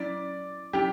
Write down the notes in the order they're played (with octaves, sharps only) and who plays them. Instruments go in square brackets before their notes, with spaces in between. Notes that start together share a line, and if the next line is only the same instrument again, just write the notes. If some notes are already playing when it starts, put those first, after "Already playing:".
Already playing: [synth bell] F#3 C#4 E4 [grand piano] D5
[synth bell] F#3 C#4 E4 [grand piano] G4